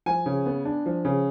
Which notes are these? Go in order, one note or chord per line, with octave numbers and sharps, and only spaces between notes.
F3 G#5
C#3
B3
D4
F3
C#3